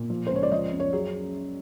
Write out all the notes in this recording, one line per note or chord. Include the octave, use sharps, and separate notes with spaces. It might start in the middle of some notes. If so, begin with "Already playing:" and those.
Already playing: A#2
F3
C5
C#2
C#5
D5
F3 D#5
F#2
C#5
F#3 G#4